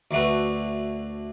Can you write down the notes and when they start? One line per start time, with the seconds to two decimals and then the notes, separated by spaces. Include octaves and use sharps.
0.11 D2 D3 A3 F#4 B4